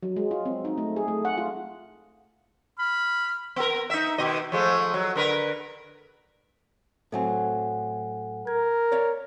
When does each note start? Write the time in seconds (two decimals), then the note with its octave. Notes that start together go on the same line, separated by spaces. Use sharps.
0.03 F#3
0.16 G#3
0.31 F4
0.45 C4
0.65 D#4
0.78 A3
0.96 G#4
1.08 A3
1.25 F#5
1.38 F4
2.79 B5 F6
3.56 B3 A#4
3.90 D#4 E5
4.18 B2 D#3 D#5
4.52 F3 G#3 A3
4.94 F#3
5.16 D3 A#4 B4
7.12 A2 F#3 C4 A4 F#5 G#5
8.47 A#4 G#6
8.92 C#5 D5 F5